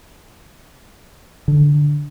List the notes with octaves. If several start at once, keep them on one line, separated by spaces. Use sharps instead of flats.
D3